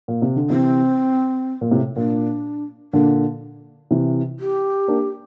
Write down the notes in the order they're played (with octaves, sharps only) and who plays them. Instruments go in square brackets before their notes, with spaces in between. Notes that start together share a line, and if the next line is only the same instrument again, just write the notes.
[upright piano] A#2
C3
D3
[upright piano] C3 E3 [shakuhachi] C4
[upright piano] A#2
A2 C3
[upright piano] A#2 [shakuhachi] D4
[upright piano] A#2 D3 [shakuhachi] D4
[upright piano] C3 E3
[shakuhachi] G4
[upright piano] A#3 D4